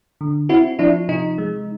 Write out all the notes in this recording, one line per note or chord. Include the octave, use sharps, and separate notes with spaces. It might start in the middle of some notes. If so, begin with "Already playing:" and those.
D3
C4 E4 F#4
F3 D4 E4
C3 D#4
G#3